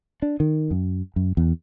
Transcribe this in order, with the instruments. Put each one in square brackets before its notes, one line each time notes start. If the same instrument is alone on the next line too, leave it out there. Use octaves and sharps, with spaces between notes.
[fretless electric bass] D4
D#3
F#2
F#2
E2